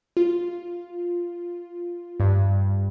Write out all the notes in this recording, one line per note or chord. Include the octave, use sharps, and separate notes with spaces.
F4
G2